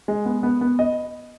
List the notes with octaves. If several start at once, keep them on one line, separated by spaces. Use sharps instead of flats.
G#3
B3
B3
B3
D#5